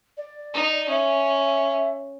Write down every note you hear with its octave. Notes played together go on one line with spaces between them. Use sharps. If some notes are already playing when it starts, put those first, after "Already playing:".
D5
D#4
C#4 E5